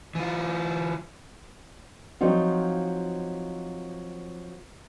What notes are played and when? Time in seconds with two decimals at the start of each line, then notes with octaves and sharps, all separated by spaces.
0.15 E3 F4
2.21 F3 F#3 C4 D#4 F4